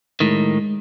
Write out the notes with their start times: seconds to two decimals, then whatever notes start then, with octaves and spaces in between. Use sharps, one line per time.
0.20 A2 D#3 G#3